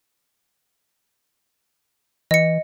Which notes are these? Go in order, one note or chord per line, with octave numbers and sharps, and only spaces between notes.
E3 D#5 C#7